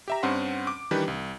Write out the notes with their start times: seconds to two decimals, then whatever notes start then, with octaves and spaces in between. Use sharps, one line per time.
0.08 G4 E5 A#5
0.23 G2 C4 C#4 F#5 C6
0.67 D6
0.91 D#3 E3 G3 D4 G4 B4
1.08 C2